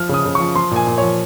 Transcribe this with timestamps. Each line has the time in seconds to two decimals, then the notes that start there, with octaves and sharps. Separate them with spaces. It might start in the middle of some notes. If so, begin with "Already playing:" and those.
Already playing: F3 F6
0.09 C#3 D#6
0.25 C#3
0.35 F3 C#6
0.55 F3 C6
0.71 A#2 G#5
0.87 A#2
0.98 F3 C#5